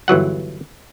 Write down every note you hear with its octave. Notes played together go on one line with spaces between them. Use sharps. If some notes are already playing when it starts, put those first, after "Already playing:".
G1 E3 F#3 F#5